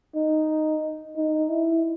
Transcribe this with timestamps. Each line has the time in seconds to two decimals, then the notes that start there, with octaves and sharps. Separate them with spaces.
0.15 D#4
1.17 D#4
1.49 E4